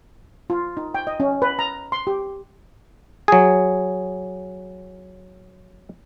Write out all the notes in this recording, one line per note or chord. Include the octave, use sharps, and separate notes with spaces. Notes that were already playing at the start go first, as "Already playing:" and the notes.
F4
D#4
G5
D#5
C#4
B4
A#5
C6
G4
F#3 G#4